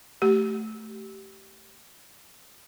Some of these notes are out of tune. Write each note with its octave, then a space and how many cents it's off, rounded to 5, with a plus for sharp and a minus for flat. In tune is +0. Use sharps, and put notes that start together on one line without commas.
A3 +0 G4 -20